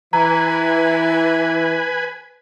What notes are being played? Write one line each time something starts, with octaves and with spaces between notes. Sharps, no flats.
E3 B4 G#5 A#5